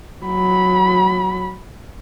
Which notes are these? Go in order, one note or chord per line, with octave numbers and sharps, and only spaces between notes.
F#3 B5